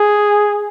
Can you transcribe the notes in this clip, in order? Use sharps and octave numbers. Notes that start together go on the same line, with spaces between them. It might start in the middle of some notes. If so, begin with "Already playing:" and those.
Already playing: G#4